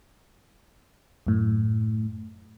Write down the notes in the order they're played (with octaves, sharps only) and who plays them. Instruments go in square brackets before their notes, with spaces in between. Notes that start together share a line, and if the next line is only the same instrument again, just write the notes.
[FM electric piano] F#2 A2